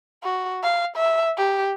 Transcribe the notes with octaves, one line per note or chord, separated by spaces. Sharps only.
F#4
F5
E5
G4